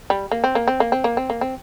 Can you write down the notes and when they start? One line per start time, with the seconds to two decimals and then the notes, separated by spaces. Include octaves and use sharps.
0.10 G3
0.32 A#3
0.44 C4
0.55 A#3
0.68 C4
0.80 A#3
0.92 C4
1.04 A#3
1.17 C4
1.30 A#3
1.41 C4